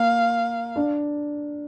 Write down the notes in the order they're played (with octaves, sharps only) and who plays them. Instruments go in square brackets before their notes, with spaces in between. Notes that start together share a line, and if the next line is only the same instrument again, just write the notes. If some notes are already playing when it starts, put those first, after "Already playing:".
Already playing: [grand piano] A#3 [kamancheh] F5
[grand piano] D4